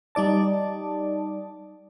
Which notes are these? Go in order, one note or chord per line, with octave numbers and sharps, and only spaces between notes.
G3 D#4 D5 A5